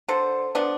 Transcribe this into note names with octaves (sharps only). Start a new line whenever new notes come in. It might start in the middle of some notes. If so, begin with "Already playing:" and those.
D3 A4 C5
F3 B3 D4